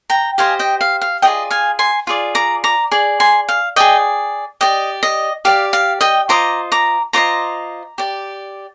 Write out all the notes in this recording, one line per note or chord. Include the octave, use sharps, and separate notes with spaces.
G5 A#5
G4 C5 D#5 F5 G#5
D#5 G5
F5
F5
F4 G#4 D5 D#5 G5
F5 G#5
G#5 C6
F4 G#4 D5
A#5 D6
A#5 D6
G#4 D5
G#5 C6
F5
G#4 D5 D#5 G5
G4 D5 D#5
D#5
G4 D5 F5
F5
D#5 G5
F4 C5 D#5 A#5 D6
A#5 D6
F4 C5 D#5 A#5 D6
G4 D5